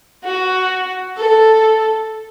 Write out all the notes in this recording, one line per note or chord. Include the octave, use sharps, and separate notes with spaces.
F#4
A4